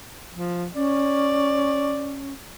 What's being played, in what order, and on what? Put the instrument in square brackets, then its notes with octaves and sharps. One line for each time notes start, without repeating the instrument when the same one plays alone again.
[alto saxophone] F3
[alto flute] C#4 [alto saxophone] D5